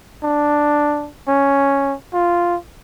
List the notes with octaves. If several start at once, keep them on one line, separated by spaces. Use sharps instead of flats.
D4
C#4
F4